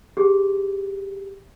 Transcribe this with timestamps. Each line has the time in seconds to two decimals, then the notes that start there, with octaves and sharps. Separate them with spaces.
0.17 G4 G#4